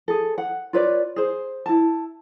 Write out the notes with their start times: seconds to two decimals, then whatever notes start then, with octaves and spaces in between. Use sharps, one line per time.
0.08 G#4 A4
0.38 F#5
0.73 F4 B4 C#5 D5
1.16 G#4 C5
1.66 E4 A5